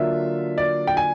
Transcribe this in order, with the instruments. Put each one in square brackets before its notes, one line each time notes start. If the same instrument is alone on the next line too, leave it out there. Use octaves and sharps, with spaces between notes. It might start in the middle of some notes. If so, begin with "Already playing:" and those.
Already playing: [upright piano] D3 F#3 A#3 D4 F4 E5
D5
G5
G#5